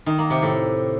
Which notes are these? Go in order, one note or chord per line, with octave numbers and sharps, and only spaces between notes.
D#3
A#3
C3
A2